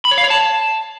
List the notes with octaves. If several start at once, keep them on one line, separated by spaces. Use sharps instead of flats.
B5
C#5
F5
C#5
A5